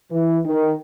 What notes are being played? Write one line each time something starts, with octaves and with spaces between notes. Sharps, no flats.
E3
D#3